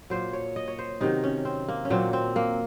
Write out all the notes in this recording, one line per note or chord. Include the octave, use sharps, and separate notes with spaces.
A#2 F#3 C5
C#5
D#5
C#5
C5
C3 D#3 F#3 D#4
C#4
C4
A#3
C#4
A#2 F#3 C4
C4
A#3